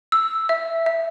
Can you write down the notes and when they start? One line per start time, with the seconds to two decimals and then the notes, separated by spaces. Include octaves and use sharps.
0.12 E6
0.49 E5
0.86 E5